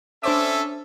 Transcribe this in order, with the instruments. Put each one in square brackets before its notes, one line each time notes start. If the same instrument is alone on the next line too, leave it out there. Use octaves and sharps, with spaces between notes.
[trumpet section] C#4 A4 E5 [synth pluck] D4 C5 D6